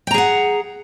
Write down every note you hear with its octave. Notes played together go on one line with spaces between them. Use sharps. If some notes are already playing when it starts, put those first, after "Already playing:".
G#4 F#5 G5 A#5